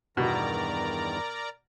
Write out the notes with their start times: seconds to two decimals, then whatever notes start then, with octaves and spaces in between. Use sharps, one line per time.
0.17 E2 G2 B2 D#3 A#4 D5 A#5